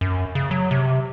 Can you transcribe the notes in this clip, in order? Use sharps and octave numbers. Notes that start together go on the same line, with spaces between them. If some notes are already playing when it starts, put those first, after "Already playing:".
F#2
C#3
F#3
C3